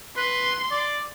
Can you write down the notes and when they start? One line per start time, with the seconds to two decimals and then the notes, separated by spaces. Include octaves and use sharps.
0.17 B4 C6
0.71 D5